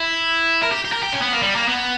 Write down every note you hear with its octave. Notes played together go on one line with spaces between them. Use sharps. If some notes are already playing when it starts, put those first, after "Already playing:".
Already playing: E4
A#4
G4
G4
A#4
G4
C#4
B3
A#3
G3
A#3
B3